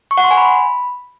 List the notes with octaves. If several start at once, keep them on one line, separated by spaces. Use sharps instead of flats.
C#6
F#5
C6
G#5
B5